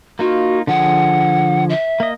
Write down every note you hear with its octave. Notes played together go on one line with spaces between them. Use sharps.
A#3 D#4 F4 F#4
D3 F3 G#4 F#5
E5
A#3 D#5